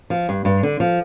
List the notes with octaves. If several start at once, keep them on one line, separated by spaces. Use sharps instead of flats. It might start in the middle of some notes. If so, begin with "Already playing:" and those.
F3
G2
G2
D3
F3